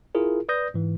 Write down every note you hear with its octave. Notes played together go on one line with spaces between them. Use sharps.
E4 F4 G#4 A#4
B4 D5 D#6 G6 A#6
G#2 E3